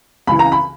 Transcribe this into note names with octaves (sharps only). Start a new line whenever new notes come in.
C#2 C#3 E3 B5
A#5
B5